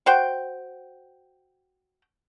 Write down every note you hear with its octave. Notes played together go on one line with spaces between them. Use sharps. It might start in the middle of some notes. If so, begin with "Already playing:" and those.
F#4 C5 G5